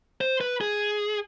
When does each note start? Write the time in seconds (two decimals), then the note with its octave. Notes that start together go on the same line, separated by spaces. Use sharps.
0.21 C5
0.41 B4
0.61 G#4